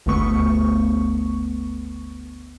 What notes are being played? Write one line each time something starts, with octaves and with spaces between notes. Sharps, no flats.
G1 D2 D3 A3 B3 C#6